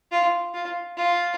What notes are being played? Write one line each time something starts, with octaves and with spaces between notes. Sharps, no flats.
F4
F4
F4